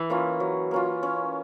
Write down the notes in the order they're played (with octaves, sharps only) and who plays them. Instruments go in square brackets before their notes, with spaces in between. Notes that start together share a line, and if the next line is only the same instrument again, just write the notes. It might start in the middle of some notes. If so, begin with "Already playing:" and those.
Already playing: [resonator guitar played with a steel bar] E3
[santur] A#3 C#4 F4
F#3
A#3 C#4 F4
C#4